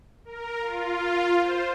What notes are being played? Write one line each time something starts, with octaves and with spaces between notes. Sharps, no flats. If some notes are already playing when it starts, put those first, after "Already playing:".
A#4
F4
C5